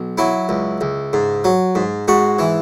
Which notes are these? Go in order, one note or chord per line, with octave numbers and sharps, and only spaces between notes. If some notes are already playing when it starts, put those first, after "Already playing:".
Already playing: B1
F#3 E4
C#2
C#2
G#2
F#3
G#2
G#2 F#4
E3